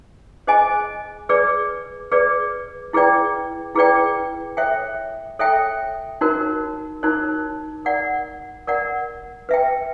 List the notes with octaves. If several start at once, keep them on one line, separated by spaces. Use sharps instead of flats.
G#4 C5 D#5 G#5
G#4 B4 D5
G#4 B4 D5
E4 G#4 B4 D5 G5
E4 G#4 B4 D5 G5
A4 C#5 E5 G5
A4 C#5 E5 G5
D#4 F#4 A#4 C#5
D#4 F#4 A#4 C#5
A#4 D5 F#5
A#4 D5 F#5
B4 E5 G5